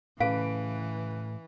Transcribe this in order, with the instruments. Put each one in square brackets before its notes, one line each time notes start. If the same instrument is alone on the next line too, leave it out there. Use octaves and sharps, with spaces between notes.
[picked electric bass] A2 [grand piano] C#3 B4 D7 [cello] E3 [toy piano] G#4 F5